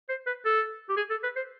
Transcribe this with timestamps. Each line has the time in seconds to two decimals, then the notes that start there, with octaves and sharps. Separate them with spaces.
0.09 C5
0.26 B4
0.45 A4
0.89 G4
0.97 G#4
1.10 A4
1.23 B4
1.36 C5